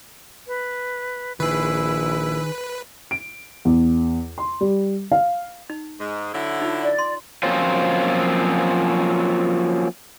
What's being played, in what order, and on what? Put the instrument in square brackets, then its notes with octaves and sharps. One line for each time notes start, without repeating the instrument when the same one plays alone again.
[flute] B4
[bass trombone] A#1 [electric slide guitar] D#3 G#4 [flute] E4 [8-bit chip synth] B4
[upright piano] D7
E2
C6
G3
F5
[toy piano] D#4
[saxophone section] G#2 G#3
D3 F#3 E4
[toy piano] D#4 F4
[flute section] D5
[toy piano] C6
[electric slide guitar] F3 F#3 A#3 C4 C#4 F4